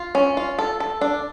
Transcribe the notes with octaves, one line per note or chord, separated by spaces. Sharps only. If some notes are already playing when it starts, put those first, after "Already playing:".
Already playing: F4
C#4
F4
A4
A4
D4